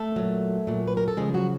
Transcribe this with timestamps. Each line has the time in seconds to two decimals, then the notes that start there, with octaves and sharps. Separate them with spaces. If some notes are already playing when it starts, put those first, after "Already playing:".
Already playing: A3 A4
0.16 A#2 F#3
0.67 A#2 F#3
0.88 B4
0.97 A#4
1.08 A4
1.17 C#3 F3 G#3 G#4
1.34 F#3 F#4